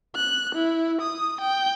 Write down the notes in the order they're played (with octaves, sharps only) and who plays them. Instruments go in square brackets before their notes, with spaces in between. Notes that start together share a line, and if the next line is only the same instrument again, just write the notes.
[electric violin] F#6
E4
D#6
G5